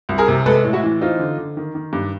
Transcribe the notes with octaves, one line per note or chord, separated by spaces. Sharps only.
C2
G#4 A#4
C3
G#3 A4 B4
A2
E4 F#4
E3
C4 D#4 F4
D3
D3
D#3
D#3
G2